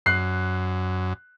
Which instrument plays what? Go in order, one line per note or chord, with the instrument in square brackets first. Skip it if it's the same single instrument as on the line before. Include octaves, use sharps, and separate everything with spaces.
[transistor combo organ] F#2 [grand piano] F#6 C7